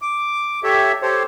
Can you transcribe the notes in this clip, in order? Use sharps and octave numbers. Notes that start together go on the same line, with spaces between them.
D6
G4 A4 C#5 E5
G4 A4 C5 C#5